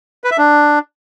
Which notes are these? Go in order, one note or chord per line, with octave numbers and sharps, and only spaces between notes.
B4
E5
D4